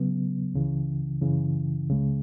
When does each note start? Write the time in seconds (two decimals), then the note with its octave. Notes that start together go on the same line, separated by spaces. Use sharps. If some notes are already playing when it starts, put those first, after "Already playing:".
Already playing: C#3 F#3 B3
0.54 C#2 C#3 E3
1.22 F#2 C#3 E3
1.89 C#2 C#3 G#3